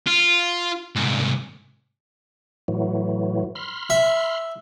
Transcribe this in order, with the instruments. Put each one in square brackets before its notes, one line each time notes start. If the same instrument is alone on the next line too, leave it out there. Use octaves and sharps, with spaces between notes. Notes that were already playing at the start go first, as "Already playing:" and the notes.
[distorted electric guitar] F4
C2 G#2
[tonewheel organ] A2 E3 F#3
B5 C6 F6
[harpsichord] E5